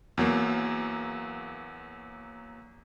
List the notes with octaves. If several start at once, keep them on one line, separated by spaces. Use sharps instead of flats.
E2 F#3 A#3